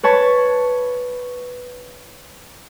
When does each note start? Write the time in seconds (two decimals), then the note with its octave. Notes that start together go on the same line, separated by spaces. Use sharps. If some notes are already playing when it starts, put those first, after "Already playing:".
0.03 B4 C#5 A5